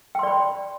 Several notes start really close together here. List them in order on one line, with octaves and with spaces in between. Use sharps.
G5 C6 D5 B5